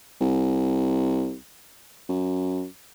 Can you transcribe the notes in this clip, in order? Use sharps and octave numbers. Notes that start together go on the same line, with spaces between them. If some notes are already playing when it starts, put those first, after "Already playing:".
C2
F#2